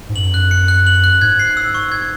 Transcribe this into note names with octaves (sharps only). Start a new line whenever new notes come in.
G#2
F#2 F#7
F#6
C#7
F#6
F#7
F#6
G#2 G#6
C7
E6
C#6
G#6